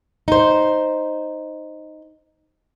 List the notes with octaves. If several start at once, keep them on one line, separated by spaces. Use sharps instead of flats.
D#4 C5